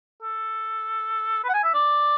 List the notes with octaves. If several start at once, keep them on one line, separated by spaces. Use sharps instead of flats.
A4
B4
F#5
G#5
E5
D5